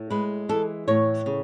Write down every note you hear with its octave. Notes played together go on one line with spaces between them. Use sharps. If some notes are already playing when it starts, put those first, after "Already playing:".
Already playing: A2
G#3 B4
E3 A4
A2 C#5
C#3